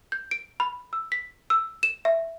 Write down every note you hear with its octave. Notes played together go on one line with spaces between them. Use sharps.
G6
D7
B5
E6
B6
E6
E7
E5